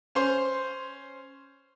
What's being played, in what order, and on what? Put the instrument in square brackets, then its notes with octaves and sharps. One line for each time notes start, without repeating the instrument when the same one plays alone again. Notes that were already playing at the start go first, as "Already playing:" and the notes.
[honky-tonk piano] C#4 C5 C6